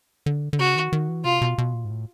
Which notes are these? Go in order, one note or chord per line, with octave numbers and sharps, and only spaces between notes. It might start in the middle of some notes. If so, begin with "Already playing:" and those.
D3
D3
C#3 F#4
D#3
D#3
E3
C3 F4
B2
B2
A#2
G#2
A2